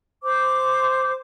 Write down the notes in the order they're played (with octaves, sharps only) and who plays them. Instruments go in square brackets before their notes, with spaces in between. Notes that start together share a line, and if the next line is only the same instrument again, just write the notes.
[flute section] C5 D6